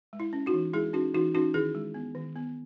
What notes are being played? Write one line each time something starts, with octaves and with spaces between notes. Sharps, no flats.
G#3
E4
C#4
D#4 F#4
E3
G#3 E4 G#4
C#4 D#4 F#4
E3 D#4 F#4
C#4 D#4 F#4
D#3 E4 G#4
G#3
B3
D#3
B3